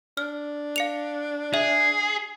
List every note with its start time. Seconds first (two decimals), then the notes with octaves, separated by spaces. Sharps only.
0.17 D4 F6
0.76 F5 C#7 F7
1.54 G#4 E5